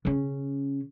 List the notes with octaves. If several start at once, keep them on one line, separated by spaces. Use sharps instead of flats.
C#3 C#4